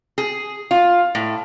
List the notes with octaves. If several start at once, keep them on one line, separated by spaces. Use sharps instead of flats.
G#4
F4
A2